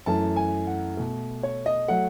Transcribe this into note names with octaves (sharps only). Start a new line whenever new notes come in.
F#2 E3 A3 A5
G#5
F#5
B2 A3
C#5
D#5
F#3 A3 F#5